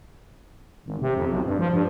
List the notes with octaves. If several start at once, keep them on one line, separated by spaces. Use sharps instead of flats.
G#1
C3
F2
B1
G2
F3
G2